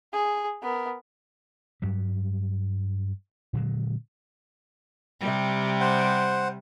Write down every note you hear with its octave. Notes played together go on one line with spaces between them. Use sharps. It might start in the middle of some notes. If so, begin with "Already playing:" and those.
G#4
B3 A#4
G2 F#3 G3
A#2 D3 F#3 G#3
C3 G3
C5 F#5